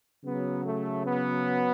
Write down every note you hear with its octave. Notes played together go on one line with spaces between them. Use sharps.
C#3 F#3 B3
A3
B3